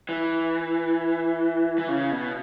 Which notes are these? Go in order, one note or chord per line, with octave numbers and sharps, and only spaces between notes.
E3
E3
C#3
B2